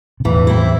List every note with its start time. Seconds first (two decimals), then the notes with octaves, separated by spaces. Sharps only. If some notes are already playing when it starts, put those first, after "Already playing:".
0.20 C3
0.25 E2 A2 E3
0.47 C4 E4